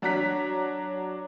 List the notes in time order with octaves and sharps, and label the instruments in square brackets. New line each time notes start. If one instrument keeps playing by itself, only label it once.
[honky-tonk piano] F#3 D4 F#4 A#5 F#6 B6